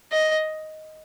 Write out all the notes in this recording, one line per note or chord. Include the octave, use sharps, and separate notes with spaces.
D#5